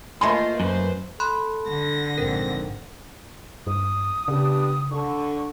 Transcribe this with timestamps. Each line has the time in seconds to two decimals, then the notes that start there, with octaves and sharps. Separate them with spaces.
0.21 A3 A#3 F4 C5 D#5 G#5 C6
0.60 F#2 B4 C5
1.20 A4 B5 C6 F#6
1.67 D3 A#6
2.18 A#1 G#2 C4 A#4
3.67 G2 D#6
4.28 C#3 B3 D4 G4
4.91 D3 C#6